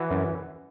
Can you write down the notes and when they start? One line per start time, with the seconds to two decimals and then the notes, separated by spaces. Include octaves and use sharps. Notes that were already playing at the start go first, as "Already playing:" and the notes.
Already playing: E3 F#4
0.11 F#2